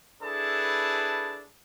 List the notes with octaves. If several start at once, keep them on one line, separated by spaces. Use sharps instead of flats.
D4 E4 G#4 A4 B4 A5